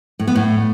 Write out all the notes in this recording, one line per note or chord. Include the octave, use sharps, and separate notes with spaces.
A2
B3
A2